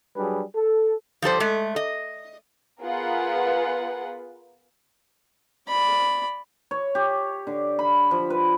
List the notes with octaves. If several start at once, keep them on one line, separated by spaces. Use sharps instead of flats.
F#3 G3 D4 G#4 B4
A4
F3 G3 A4 C5
G#3 A3
D#5
B3 F4 G#4 A#4 B4 F#5
D5 B5
C#5
G4
D3
B5
F3
B4